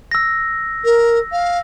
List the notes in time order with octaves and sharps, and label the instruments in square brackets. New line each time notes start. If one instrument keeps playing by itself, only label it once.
[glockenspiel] E6 A#6
[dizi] A#4
F5